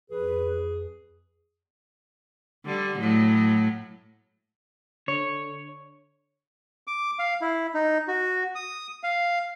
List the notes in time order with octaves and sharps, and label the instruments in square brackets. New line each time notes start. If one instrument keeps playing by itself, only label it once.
[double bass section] F2 [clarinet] G#4 [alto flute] B4
[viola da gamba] D3 G3
A2 F#3
[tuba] D3 [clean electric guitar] C#5
[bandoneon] D6
F5
E4
D#4
F#4
D#6
F5